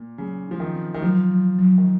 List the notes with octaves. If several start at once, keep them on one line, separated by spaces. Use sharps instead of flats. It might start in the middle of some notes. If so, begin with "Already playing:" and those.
Already playing: A#2
C#3 F#3
D#4
F3
D#3
C4
D#3
F3 F#3
F#3
F#3
D#3